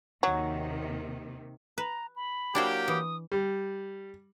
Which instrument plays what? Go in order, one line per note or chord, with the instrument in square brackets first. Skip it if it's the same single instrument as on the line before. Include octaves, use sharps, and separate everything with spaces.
[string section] D#2 C3 D#3 [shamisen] F#3
[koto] B4 [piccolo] A#5
[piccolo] B5
[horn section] F#3 A#3 G4 [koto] D4 E4 C5
[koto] E3 [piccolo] D#6
[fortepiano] G3